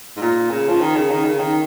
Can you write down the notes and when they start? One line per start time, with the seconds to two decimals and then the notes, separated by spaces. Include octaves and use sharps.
0.16 G#2
0.21 A#2
0.50 C#3
0.68 F3
0.80 D#3
0.95 C#3
1.10 D#3
1.24 C#3
1.39 D#3